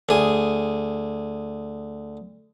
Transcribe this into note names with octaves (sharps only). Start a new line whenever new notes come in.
D2 G#4